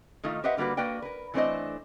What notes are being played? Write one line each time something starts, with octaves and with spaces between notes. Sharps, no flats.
D#3 A3 D#4 F4
G4 B4 C5 D#5 E5 F#5
D3 G3 A#3 F#4 B4
A#3 F#4 B4 D5 G5
A#4 B4
E3 A3 C4 D4 C5 D#5